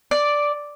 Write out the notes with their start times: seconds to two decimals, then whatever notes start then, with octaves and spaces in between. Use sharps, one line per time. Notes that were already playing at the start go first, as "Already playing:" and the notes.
0.11 D5